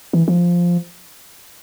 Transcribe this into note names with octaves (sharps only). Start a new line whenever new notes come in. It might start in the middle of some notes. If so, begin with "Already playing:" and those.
E3
F3